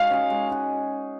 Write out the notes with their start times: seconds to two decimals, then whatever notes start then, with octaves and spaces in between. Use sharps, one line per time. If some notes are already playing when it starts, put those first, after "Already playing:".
Already playing: G#3 D#4 F#4 F5
0.10 C#4 G#4
0.30 G#3
0.49 D#4 F#4